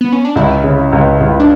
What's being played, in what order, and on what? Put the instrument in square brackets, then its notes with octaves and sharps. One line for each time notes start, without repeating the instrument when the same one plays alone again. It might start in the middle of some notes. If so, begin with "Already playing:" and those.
[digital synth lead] B3
C#4
D4
[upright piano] C#2 [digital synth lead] E4
[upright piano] C#3
C#2
C#2
[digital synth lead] D4